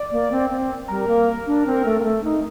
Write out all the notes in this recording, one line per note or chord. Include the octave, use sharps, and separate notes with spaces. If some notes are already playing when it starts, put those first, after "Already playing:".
Already playing: D5
A#3
C4
C4
G3 A#4
A#3
D4
C4
A3
A#3
A3
D#4